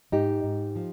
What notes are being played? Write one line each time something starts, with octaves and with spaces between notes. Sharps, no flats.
G#2 D#4 G4
G#2
F3